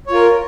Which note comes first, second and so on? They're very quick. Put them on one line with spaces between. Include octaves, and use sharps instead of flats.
C#5 F4 A#4